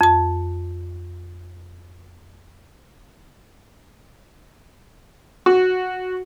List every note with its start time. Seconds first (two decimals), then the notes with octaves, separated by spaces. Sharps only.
0.01 F2 A5
5.46 F#4